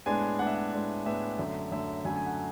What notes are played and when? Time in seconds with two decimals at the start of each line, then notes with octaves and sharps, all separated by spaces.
0.06 A2 G#3 B3 D4 G#5
0.39 A2 G#3 B3 D4 F#5
0.47 E5
0.55 F#5
0.73 A2 G#3 B3 D4
1.06 A2 G#3 B3 D4 E5
1.39 F#2 D3 A3
1.71 F#2 D3 A3 E5
2.05 F#2 D3 A3 G#5
2.16 G#5
2.26 F#5